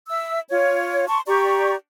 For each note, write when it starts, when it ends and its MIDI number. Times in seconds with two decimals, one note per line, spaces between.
0.09 0.40 76
0.09 0.40 88
0.49 1.05 65
0.49 1.05 73
1.08 1.20 81
1.08 1.20 84
1.08 1.20 85
1.27 1.74 67
1.27 1.74 74
1.27 1.74 82
1.27 1.74 85